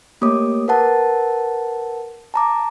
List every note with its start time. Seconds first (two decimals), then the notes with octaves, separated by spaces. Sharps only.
0.21 A3 A#3 G4 C#5 D6 D#6
0.68 A#4 B4 F#5 A5
2.34 A5 A#5 D6